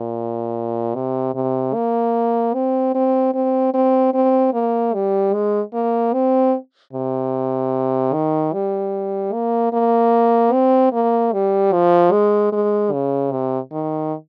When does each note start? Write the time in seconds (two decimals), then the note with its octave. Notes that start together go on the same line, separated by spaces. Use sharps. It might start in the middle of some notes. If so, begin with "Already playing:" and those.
Already playing: A#2
0.95 C3
1.35 C3
1.74 A#3
2.54 C4
2.95 C4
3.34 C4
3.74 C4
4.14 C4
4.53 A#3
4.94 G3
5.34 G#3
5.74 A#3
6.13 C4
6.93 C3
8.13 D#3
8.53 G3
9.33 A#3
9.73 A#3
10.53 C4
10.93 A#3
11.32 G3
11.73 F3
12.12 G#3
12.52 G#3
12.93 C#3
13.32 C3
13.72 D#3